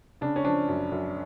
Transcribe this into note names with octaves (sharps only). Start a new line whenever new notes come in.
C#3 D4
C#4
F3 D4
F#2
F#2